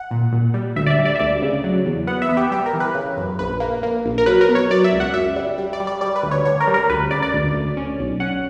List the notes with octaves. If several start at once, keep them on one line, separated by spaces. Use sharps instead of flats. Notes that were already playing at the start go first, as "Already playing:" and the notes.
Already playing: F#5
A#2
A#2
G3
D2 E5
D5
E5
G3
D5
E5
D2 D5
C#3
F#3
E2
B3 F#5
E5
B3
G4
G3 G4
A#4
E3
B4
C#3
F#2
A#1 B4
A#3
A#3
A#1
A#4
F#3 B4
A#4
B2
C#5
F#3 D5
E5
C#2
F#5
F#2 E5
G3
G3
D5
G3
D5
G3 D5
B4
D2
C#5
D3 C#5
A#4
G3
A#4
D2 B4
C#3 D5
D5
D2
D2
C#4
B1
C#4 F#5